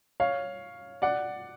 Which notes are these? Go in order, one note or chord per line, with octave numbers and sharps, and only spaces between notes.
C#5 F5
D5 F#5